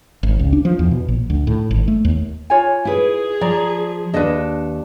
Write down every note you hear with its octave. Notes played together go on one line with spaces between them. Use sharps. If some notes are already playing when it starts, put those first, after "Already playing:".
G#1
C#2
D4
F3
E2
B2
A#1
D2
A2
G#1
A3
D#2
F4 C#5 G#5
E4 G#4 B4
F3 D5 A#5
D#2 D4 A4 B4 D#5